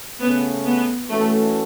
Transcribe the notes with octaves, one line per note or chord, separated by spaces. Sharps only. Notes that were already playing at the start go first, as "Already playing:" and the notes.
C#3 A3 B3 C#4
B3
E3 A3 C#4 F#4 A4